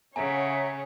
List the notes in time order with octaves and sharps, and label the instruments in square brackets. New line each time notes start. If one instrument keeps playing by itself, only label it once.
[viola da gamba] C#3 [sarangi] C#5 [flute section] E5 F#5 A#5 [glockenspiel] G#5